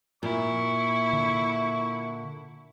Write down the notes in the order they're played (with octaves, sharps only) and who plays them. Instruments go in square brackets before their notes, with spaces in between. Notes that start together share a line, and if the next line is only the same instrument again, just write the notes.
[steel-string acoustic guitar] A#2 [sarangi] E4 [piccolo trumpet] C#6
[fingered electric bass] D3